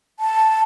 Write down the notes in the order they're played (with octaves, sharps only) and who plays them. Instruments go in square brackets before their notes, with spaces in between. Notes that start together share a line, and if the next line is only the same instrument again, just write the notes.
[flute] A5